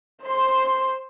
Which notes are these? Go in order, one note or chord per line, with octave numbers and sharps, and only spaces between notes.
C5 C6